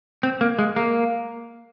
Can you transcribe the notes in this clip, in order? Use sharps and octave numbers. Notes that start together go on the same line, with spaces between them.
C4
A#3
G#3
A#3